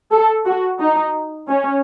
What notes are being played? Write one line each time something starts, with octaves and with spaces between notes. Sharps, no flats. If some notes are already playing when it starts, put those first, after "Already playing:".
A4
F#4
D#4
C#4